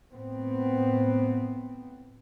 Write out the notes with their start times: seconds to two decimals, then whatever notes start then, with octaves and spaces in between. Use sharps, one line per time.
0.11 A2 B3 C4